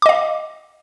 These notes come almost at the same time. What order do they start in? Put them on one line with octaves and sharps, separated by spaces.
D6 D#5 F5